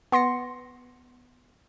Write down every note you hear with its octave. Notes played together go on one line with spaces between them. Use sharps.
B3 C6 A#6 C#7